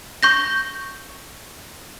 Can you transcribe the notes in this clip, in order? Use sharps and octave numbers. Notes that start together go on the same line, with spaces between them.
C#6 G6 A#6